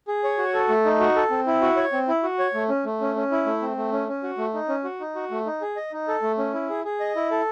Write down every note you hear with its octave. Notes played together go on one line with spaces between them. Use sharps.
G#4
C#5
F#4
A4
A3
D#4
F#4
A4
C4
E4
F#4
C#5
C4
E4
F#4
C#5
A3
C#4
A3
C#4
C#4
E4
A3
C4
A3
C#4
C#4
F#4
A3
D#4
C#4
F#4
D#4
F#4
A3
D#4
G#4
D#5
D#4
A4
A3
C#4
E4
G#4
G#4
D#5
E4
A4